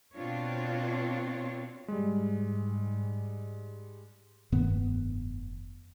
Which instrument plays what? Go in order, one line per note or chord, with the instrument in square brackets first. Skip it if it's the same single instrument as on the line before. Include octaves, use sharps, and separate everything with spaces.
[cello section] B2 C4 D4 F4 C#5
[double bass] G#2 [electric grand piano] G3 G#3
[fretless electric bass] F1 G2 D#3 B3